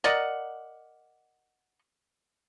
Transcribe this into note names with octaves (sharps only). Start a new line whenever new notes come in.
A#4 D5 D#5 F#5